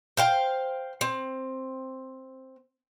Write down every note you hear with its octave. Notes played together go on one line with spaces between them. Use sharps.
C5 F5 G5
C4